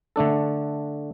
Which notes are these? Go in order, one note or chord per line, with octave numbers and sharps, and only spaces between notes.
D3 A3 D4 A4